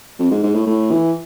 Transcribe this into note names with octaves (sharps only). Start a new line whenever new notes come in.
F2
G#2
G#2
A2
A2
E3